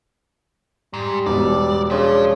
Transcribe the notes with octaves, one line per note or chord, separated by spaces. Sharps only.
G#2 G3
E1 B2 D5
C#3 F3 D4